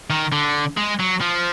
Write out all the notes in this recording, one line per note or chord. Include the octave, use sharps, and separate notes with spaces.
D#3
D3
G#3
F#3
F3